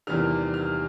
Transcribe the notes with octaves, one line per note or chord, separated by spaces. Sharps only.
E2 C3 D#3 G3 F6
F6